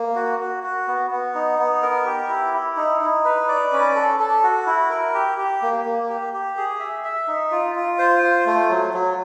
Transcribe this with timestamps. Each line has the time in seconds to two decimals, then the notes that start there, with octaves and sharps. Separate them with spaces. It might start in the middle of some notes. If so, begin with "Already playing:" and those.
Already playing: A#3
0.16 F#4
0.40 F#4
0.64 F#4
0.87 B3
1.11 B3
1.35 D#4
1.59 B3
1.82 A#4
2.05 G4
2.29 E4
2.53 E4
2.77 D#4
3.01 D#4
3.25 B4
3.48 D5
3.73 C#4
3.95 A4
4.19 A4
4.43 F#4
4.66 E4
4.90 A#4
5.15 G4
5.38 G4
5.62 A#3
5.85 A#3
6.09 G4
6.33 G4
6.57 G#4
6.80 E5
7.04 E5
7.28 D#4
7.51 F4
7.75 F4
7.99 C5
8.23 F4
8.46 A3
8.70 F#3
8.94 F#3